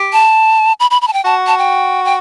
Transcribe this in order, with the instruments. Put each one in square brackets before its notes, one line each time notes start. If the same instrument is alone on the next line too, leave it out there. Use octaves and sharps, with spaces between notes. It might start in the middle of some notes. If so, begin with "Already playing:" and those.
Already playing: [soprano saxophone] G4
[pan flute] A5
B5
B5
B5
A5
G5
[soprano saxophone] F#4 [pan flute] A5
[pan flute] A5
G5
G5